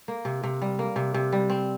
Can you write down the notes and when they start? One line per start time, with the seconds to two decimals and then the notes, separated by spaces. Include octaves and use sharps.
0.08 A#3
0.25 C3
0.43 C3
0.62 G3
0.79 A#3
0.96 C3
1.14 C3
1.33 G3
1.50 C4